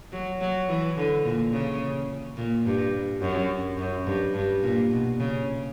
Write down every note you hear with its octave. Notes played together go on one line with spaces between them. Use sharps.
F#3
F#3
E3
D3
A#2
C#3
A#2
G2
F#2
F#2
G2
G2
A#2
B2
C#3